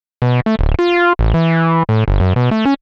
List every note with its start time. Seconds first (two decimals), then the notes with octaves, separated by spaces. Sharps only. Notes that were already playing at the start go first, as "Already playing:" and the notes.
0.22 B2
0.46 A3
0.59 D1
0.79 F4
1.19 A1
1.34 E3
1.89 A2
2.08 G1
2.20 F#2
2.36 B2
2.51 A3
2.65 C#4